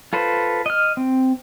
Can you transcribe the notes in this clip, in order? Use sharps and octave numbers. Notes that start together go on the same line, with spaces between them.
F4 A4 B4 C5
D#5 F6
C4